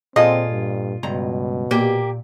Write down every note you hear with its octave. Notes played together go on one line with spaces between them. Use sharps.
A#2 C4 F4 G#4 A4 D#5
G2
C#2 G2 B2 A#5
A#2 A#3 G4